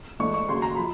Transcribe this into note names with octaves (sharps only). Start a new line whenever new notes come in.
G#2 E3 A3 D4 C#6
C#6
D#2 C#3 F#3 C6
A#5
F3 B5